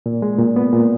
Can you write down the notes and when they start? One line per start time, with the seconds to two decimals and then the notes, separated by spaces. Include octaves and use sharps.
0.06 A#2
0.22 G#3
0.39 A#2
0.56 B3
0.73 A#2